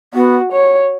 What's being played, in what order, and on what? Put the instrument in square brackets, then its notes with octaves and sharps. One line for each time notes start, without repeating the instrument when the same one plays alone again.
[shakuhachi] B3 [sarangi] F#4
[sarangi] C#5